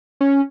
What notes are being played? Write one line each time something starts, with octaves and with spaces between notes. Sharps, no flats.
C#4